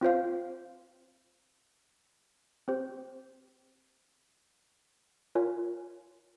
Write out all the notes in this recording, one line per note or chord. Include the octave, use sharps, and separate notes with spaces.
C4 F4 C5 F5
C4 G4 C5
F4 A#4 C#5 G#5